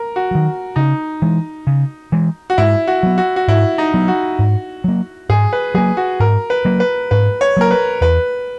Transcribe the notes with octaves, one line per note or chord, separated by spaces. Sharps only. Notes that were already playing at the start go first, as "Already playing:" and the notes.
Already playing: A#4
F#4
D#3 F#3
C#3 D#4
E3 G#3
C#3
E3 G#3
F#4
G#2 E4
F#4
F#3 B3
F#4
F#4
G#2 E4
D#4
F#3 B3
F#4
G#2
F#3 A#3
G#2 G#4
B4
F#3 A#3 G#4
F#4
G#2 A#4
B4
F#3 A#3
B4
G#2 B4
C#5
F#3 A#3 A#4
B4
E2 B4